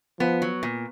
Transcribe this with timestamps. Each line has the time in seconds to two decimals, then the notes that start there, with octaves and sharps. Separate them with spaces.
0.20 F3 B3
0.42 F#3
0.63 A#2